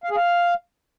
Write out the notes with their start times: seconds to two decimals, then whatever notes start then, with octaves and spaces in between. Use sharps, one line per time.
0.04 F5
0.10 G#4
0.17 F5